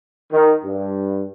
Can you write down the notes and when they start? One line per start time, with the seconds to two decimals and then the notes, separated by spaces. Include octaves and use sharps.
0.32 D#3
0.64 G2